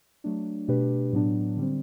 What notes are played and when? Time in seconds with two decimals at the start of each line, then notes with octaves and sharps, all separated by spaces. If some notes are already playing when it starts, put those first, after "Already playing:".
0.24 F#3 A3 D4
0.68 B2 A3 D4 G4 B4
1.13 A2 F#3 B3 D4
1.57 D3 G3 C4